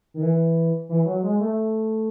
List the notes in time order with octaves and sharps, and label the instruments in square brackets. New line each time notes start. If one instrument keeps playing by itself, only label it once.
[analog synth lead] D#3
E3
E3
F#3
G#3
A3